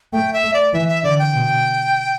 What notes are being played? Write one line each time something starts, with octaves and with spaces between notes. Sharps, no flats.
A3 G5
E5
A3
D5
E3 E5
E5
D3 D5
G5
B2